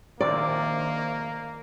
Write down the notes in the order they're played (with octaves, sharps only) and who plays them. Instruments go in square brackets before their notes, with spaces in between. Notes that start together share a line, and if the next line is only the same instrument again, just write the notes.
[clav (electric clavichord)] A#1 C3 [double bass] D#3 [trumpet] A#3 [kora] D5